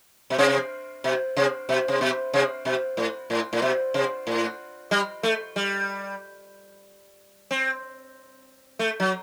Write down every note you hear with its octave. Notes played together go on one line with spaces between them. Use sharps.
B2
C3
B2
C3
B2
C3
B2
C3
B2
A2
A2
A2
B2
C3
A2
G3
A3
G3
C4
A3
F#3